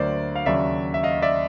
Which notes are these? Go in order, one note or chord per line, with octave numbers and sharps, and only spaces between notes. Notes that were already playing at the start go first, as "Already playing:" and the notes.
Already playing: D2 D3 F#3 A#3 C5 D5
F5
D#2 C#3 F#3 D5 E5
E5
D#5 F5
D5 E5